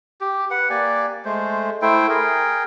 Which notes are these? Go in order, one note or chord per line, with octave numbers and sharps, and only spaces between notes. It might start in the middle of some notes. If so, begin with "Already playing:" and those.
G4
B4 F#5
A#3 G4 D5 G#5
G#3 A3 C5
A3 E4 C5 G5
G#4 A#4 G5